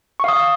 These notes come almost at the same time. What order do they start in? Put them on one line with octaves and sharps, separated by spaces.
C#6 F5 D#6